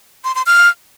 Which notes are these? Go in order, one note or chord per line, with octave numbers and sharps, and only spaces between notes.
C6
C6
F6